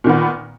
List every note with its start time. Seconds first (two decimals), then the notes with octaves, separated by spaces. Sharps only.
0.04 A#2
0.07 D#3
0.09 B3